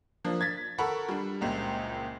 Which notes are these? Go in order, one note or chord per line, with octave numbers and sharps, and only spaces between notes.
F3 A#3 D4
G#6 A6 B6
A4 A#4 F#5 B5 C#6
G3 D4
F#1 C#2 A#2